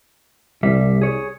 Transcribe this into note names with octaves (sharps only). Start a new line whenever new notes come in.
C2 G3 E5
G#4 C#5